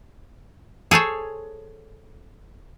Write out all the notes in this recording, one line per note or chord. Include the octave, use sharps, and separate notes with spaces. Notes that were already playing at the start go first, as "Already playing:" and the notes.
G#4 A4 C5 C#5